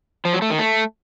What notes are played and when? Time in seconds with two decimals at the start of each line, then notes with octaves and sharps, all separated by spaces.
0.25 F3
0.33 F#3
0.42 A3
0.50 D#3
0.59 A3